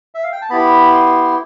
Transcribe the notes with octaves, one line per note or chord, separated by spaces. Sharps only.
E5
F5
G5
A5
B3 E4 G4 B5
C6